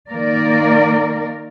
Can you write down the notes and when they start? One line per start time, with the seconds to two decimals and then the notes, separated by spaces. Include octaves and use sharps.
0.11 D#3 A#3 A#4 D5